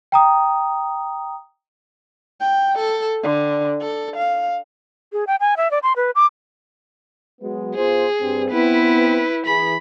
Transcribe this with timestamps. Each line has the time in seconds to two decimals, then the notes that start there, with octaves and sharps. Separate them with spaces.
0.12 G5 A#5 D#6
2.40 G5
2.78 A4
3.23 D3
3.81 A4
4.16 F5
5.13 G#4
5.27 G5
5.40 G#5
5.57 E5
5.71 D5
5.83 C6
5.96 B4
6.15 D6
7.42 F#3 G#3 B3
7.76 B2 F4 G#4 C5
8.21 G2 C4
8.52 B3 C4 E4 B4
9.46 E3 G#4 B5